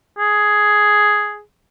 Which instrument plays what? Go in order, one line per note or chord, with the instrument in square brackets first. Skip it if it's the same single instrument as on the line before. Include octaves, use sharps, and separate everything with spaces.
[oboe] G#4